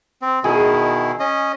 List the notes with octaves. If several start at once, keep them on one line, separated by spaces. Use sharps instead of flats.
C4
B2 D#3 E4 G#4
C#4 D#5